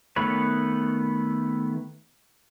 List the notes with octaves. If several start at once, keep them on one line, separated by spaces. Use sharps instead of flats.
D#3 A3 B3 B4 C#5